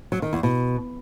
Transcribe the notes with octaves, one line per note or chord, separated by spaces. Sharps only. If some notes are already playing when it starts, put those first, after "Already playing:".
F#3
D#3
E2
B2